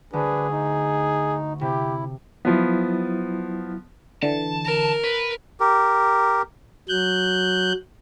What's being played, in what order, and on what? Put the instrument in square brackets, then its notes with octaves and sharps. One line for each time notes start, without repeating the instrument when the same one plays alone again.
[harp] D2 [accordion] D4 B4 [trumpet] G#4
[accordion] D#4
[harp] C3 [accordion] E4 [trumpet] G4
[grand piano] F3 B3 [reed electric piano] F#3 E4
[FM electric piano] D3 E3 [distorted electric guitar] A5
[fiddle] A#4
[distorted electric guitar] B4
[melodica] G4 A#4
[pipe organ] F#3 F#6 G6